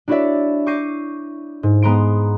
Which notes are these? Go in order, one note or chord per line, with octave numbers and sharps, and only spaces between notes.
D4 E4 F#4 C#5 D5 E5
C#6 D6 G6 A#6 C7 D#7
G#2
G#3 B3 A#5 C6 D7